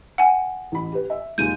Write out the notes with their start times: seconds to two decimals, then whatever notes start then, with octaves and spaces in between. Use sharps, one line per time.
0.18 F#5 G#5
0.72 A1 B5
0.92 G4 B4
1.10 E5
1.38 D#2 A#2 G#3 G6 D#7